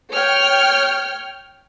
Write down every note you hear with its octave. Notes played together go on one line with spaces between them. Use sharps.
C#5 G5 F6